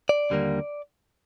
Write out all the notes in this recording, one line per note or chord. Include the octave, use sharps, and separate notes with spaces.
D5
D#2 D3 G3 A#3